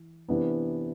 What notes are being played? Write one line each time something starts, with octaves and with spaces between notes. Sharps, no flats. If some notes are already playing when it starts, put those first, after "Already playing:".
Already playing: E3
C3 E3 B3 D4